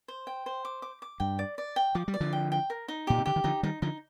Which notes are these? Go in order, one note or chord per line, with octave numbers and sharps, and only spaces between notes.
C5
G5
C5
D6
D6
D6
G2 G5
D5
D5
G5
F3 D6
G3
D5
D3 F3
G5
G5
A#4
D#4
A#2 G4
C3
D3 G4
D#3
D3 F3 D#4
D#3 G3 D#4
D3 F3 D#4